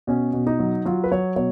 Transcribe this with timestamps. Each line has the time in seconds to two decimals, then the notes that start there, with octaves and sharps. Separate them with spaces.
0.07 B2 C#4
0.33 B2
0.47 D#4
0.59 F#3
0.85 F#3 F4
1.04 B4
1.11 F#3 C#5
1.36 B2 C#5